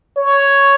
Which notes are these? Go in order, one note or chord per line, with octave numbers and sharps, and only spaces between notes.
C#5